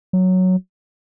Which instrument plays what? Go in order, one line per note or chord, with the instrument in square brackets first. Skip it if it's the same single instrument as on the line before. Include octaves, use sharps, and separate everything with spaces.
[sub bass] F#3